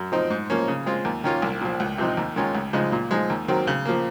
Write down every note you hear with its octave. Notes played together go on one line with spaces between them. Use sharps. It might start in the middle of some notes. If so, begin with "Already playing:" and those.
Already playing: F#2
F3 C4 D#4
G#2
F3 A#3 C#4
C#3
G#3 C4 F4
D#2
D#3 A#3 C#4 F4
C2
A#2 F3
C#2
C3 F3 C4 D#4
D#2
D#3 G#3 C#4 F4
C#2
C#3 F3 G#3 D#4
A#2
F3 G#3 D#4
D#2
D#3 F#3 C4
C#3
F3 A#3